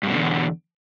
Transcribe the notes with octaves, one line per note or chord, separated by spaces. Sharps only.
E2 G2 B2 D3